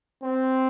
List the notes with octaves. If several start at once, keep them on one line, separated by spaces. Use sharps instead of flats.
C4